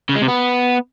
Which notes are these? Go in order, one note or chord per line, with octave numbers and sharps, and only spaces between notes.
C#3
G#3
C3
B3